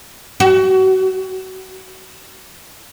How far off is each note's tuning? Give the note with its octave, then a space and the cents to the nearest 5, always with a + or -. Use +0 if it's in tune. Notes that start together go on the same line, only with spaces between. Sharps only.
F#4 +30